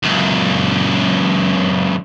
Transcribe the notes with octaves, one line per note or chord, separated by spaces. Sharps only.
C#2 F#2